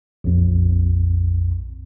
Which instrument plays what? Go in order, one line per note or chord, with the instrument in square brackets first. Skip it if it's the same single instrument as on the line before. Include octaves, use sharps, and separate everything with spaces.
[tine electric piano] A#1 F2